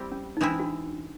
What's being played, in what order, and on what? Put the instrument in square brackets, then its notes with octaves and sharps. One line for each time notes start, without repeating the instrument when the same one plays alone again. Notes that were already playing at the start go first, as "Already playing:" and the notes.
Already playing: [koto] G3 C4 E4 G4
[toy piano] C#4
D#4
[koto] E3 G#3 C4 E4 [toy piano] D4
[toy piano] C#4
F#4